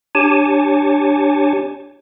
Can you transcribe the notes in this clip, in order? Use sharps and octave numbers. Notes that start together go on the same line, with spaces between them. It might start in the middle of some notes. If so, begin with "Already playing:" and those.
D4 G4 C#5 G#5 A5